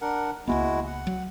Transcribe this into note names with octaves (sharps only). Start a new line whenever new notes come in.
D4 A#4 F#5
C#2 G#3 A#3 B3 E4 F#4
F#5
F#3